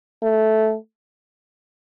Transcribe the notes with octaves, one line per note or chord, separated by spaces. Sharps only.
A3